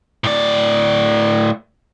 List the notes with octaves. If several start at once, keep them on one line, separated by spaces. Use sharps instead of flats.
A2 D5